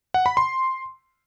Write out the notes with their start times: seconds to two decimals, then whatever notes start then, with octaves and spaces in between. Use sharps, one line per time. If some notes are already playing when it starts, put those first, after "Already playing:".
0.14 F#5
0.26 B5
0.37 C6